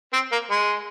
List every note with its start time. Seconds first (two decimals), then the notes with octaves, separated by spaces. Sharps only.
0.13 C4
0.32 A#3
0.50 G#3